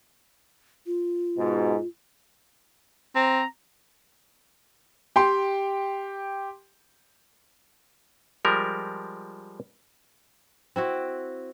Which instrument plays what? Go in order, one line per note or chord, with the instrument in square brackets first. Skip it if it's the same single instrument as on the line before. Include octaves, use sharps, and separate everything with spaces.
[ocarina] F4
[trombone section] G#2 B2
[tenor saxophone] C4 [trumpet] A#5
[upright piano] G4 G5 C6
[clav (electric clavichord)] F3 G3 G#3 A#4
[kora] C4 E4 F#4